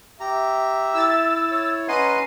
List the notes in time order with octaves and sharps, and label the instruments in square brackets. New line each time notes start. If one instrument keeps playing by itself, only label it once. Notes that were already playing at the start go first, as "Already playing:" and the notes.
[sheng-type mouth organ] G4 A#5 [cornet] E5
[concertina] E4 [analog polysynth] E6 A6
[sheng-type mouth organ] C#5
[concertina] C#4 F#5 C6 [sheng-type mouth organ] B4 D#5 [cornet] A#5 [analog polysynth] C7 D#7